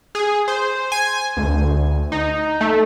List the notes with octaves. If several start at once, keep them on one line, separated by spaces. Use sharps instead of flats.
G#4
C5
G#5
D2
D#4
A3